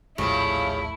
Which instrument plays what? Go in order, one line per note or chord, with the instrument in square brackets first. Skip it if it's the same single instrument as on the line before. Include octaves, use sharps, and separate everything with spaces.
[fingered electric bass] D#1 A#1 A2 [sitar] C#3 F3 G3 [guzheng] A3 [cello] E4